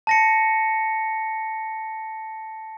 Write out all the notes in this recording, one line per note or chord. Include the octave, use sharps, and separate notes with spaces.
A5 A#6 C#7